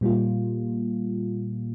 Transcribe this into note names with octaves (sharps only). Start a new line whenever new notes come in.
A#2 G3 A#3 F4